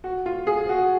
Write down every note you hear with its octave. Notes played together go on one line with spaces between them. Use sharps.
F#4
F4
G#4
F#4